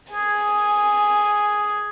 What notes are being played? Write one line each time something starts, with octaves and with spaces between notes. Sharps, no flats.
G#4 G#5